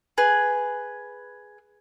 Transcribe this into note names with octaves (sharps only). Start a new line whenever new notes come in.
G#4 B4